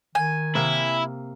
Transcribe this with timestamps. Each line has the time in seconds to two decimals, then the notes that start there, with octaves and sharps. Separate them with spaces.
0.15 D#3 G#5
0.55 C3 A#3 E4